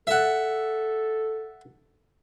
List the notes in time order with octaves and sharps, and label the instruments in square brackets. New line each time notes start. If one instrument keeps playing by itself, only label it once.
[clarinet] A4 [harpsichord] E5 F#5